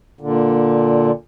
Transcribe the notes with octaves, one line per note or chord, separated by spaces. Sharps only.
A#2 D3